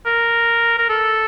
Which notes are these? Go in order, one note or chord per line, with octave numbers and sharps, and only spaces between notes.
A#4
A#4
A4